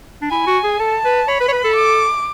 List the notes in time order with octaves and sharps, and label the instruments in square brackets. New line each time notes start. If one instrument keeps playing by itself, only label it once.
[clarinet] D4
[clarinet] E4 [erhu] G#5
[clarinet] F#4
G#4
[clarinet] A4 [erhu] A5
[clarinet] B4
[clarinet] C#5 [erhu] B5
[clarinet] B4
C#5
B4
A4
[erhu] D6